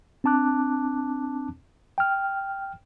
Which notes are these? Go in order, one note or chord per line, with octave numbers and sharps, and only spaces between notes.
C4 D4 A5 D6 F#6
G5 F6